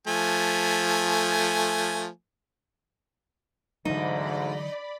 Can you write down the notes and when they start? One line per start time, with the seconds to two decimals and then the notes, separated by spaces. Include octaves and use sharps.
0.07 F3 A3 G#5
3.85 D2 G#2 D3 E3 F#3 D#4 D5 B5